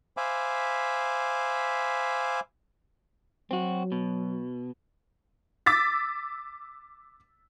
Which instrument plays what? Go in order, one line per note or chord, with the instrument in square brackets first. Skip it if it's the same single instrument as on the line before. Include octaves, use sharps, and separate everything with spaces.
[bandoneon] C5 E5 F5 G#5 B5 D6
[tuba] F#3 [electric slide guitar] C4 F#4
[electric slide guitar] B2
[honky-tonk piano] D6 E6 A6 B6